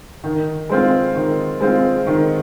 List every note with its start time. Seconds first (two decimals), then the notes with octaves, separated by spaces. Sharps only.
0.24 D#3
0.69 G#3 C4 F4
1.15 D#3
1.60 G#3 C4 F4
2.07 D#3